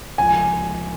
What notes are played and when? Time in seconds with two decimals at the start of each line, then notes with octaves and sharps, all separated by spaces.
0.18 C#2 C3 F3 G#5